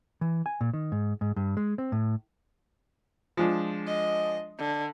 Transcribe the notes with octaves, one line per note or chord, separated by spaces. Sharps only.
E3
G#5
A#2
D#3
G#2
G#2
G2
G#3
C4
A2
F3 G#3 D4
D#5
D3